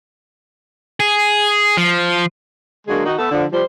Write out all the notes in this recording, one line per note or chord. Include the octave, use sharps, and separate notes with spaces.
G#4
F3
D3 F#3 G#3 A#3 D4 G#4
D#3 D#4 F#4
A3 B3 A4
D3 F3
F3 G3 C5